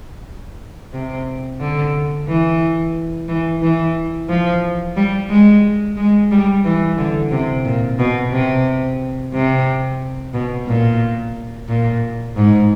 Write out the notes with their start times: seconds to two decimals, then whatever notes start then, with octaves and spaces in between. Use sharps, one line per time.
0.93 C3
1.60 D3
2.28 E3
3.28 E3
3.62 E3
4.29 F3
4.96 G3
5.29 G#3
5.97 G#3
6.31 G3
6.65 E3
6.98 D3
7.31 C3
7.65 A#2
7.99 B2
8.32 C3
9.33 C3
10.33 B2
10.67 A#2
11.68 A#2
12.36 G#2